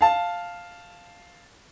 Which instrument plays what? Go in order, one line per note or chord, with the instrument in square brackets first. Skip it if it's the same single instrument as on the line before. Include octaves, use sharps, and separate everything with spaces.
[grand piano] F5 A5